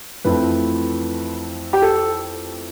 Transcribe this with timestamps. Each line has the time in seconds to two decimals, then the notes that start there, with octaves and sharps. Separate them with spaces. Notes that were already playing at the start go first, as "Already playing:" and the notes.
0.24 F2 E3 A3 C4 B4
1.73 G4
1.82 A4